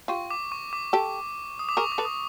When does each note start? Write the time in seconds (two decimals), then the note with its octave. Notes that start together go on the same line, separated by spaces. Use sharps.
0.08 F4 G4 C#6
0.31 D6
0.52 C#6
0.73 D6
0.93 G4 A4
1.59 D#6
1.69 D6
1.77 G#4 A#4 C#6
1.92 D6
1.98 A4 B4
2.05 D#6